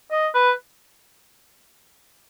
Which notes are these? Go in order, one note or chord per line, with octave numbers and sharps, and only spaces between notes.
D#5
B4